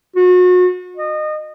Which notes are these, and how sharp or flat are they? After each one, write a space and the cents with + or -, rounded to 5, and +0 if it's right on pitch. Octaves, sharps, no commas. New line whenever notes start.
F#4 -35
D#5 -25